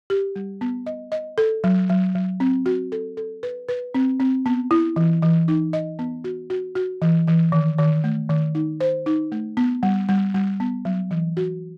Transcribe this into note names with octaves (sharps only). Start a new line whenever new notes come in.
G4
G3
B3
D#5
D#5
A4
F#3
F#3
F#3
C4
F#4
A4
A4
B4
B4
C4
C4
B3
E4
E3
E3
D#4
D#5
B3
F#4
F#4
F#4
E3
E3
D#3
D#3
A3
D#3
D#4
C5
D#4
A3
B3
G3
G3
G3
B3
F#3
E3
F#4